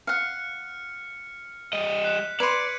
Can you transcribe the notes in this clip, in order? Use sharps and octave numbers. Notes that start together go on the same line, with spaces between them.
F5 F#5 F6 C#7
G3 D#5
F#6 B6
B4 D5 C6 G#6 C#7 D#7